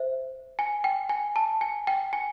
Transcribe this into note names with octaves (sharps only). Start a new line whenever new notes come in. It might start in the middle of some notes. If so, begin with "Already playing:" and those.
Already playing: C5 E5
G#5
G5
G#5
A5
G#5
G5
G#5